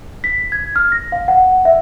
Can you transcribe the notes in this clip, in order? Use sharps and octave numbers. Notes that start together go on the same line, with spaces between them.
B6
G#6
F6
A#6
F5
F#5
E5